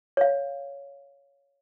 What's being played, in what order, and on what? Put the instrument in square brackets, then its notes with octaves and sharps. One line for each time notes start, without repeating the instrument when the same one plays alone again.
[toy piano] C#5 F5